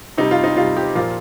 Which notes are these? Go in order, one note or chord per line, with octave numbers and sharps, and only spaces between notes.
C3 G3 D#4
F4
D#4
C3 G3 F4
G4
A#2 F3 F4